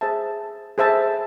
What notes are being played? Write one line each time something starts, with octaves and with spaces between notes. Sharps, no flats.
G#4 C5 E5 A5
G#4 C5 E5 A5